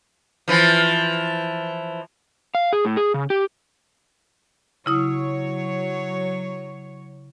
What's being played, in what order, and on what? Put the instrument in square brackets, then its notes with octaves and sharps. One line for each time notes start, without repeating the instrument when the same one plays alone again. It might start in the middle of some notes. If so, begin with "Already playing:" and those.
[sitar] E3 F3
[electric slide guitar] F5
G#4
A2
G#4
C#3
G4
[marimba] C#3 E4 D#6 [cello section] F#3 C#5